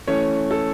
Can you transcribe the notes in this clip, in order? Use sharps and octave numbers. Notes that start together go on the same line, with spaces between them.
E3 A3 C#4 C#5
A4